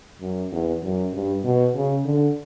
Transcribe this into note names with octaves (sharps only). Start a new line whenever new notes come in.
F#2
E2
F#2
G2
B2
C#3
D3